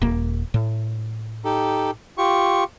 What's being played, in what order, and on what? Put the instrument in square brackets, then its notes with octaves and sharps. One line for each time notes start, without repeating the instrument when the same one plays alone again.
[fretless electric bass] D#1 A#3
A2
[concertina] D#4 G4 A4
F4 G4 C#6